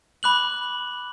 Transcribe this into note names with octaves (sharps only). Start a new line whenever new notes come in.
B5 D6 F#6 F#7